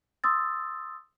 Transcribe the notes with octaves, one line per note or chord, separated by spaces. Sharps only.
C6 D#6 E6 A6